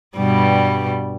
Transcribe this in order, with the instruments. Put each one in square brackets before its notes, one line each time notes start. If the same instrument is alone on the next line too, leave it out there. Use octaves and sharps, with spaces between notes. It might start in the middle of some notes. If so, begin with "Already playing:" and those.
[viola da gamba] G2 B2 G3